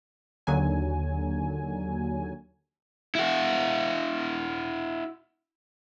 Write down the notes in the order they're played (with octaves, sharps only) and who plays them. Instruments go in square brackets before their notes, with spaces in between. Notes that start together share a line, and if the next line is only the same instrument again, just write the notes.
[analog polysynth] D#2 D3 F#3 G#5
[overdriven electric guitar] E4 F#4